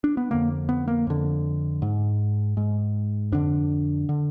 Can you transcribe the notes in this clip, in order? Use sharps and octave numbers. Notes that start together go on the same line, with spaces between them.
D4
B3
F2 D3 A#3
B3
A#3
F2 D3
G#2
G#2
F2 D3 D4
D3